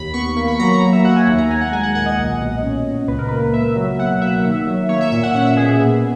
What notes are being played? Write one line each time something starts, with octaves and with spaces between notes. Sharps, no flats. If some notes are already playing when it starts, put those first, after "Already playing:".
Already playing: D#2 B5
B3 C#6
A#3 C#6
B5
F#3 A#5
A#5
A#3
E5
F#3 F#5
G#5
D#2
A#5
D#2 G#5
F#5
G#3 G#5
F#5
A#2 F#5
D#5
B1
B2
C#4
A#2
C#2 B4
A#4
A#3 B4
C#2 E5
F#3
B2 F#5
A#3 E5
D#3
F#3
A#3 C#5
E5
A#2 E5
F#5
C#4 F#5
E5
B2 G#4
B3